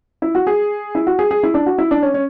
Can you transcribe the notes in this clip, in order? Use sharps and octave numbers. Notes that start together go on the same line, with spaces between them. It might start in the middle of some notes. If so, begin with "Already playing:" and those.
E4
F#4
G#4
E4
F#4
G#4
G#4
E4
D4
F#4
E4
D4
C#4
C#4